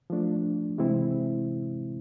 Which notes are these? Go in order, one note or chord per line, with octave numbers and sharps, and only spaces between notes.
F3 A3 D4
C3 E3 G#3 C4 E4